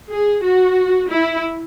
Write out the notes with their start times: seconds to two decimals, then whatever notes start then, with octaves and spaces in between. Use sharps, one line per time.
0.10 G#4
0.43 F#4
1.10 E4